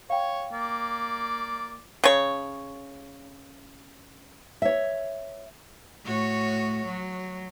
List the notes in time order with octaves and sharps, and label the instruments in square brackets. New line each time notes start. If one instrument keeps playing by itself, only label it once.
[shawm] C#5 [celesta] F5 G5
[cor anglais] A#3 [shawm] D5
[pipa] C#3 C#5
[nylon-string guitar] C#5 E5
[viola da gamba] A2 F#4 C#5
F#3